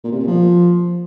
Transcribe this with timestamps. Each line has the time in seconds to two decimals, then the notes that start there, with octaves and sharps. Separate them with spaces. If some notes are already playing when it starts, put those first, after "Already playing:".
0.04 A#2
0.12 C3
0.20 A#2
0.27 F3